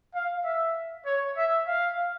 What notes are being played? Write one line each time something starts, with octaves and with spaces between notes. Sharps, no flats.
F5
E5
C#5
E5
F5